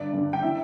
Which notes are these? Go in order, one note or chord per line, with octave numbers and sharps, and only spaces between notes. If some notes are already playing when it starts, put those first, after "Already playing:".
Already playing: G2 D3 D5
G2 D3
G5
E3 E5